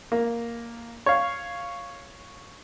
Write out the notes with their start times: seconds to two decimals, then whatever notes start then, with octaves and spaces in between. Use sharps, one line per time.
0.12 A#3
1.06 C#5 F5